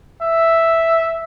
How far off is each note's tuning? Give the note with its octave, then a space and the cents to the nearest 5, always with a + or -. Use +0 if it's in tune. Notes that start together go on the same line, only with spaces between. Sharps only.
E5 +0